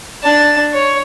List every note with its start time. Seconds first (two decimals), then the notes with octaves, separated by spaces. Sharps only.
0.23 D4 A5
0.73 C#5